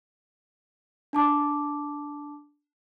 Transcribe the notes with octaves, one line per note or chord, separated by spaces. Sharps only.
D4 A5 D6